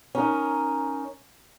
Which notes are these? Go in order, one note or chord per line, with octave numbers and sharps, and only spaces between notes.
C#4 D#4 A#4